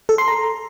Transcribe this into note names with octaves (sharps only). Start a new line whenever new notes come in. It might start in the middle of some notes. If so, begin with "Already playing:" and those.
A4
C6
A#5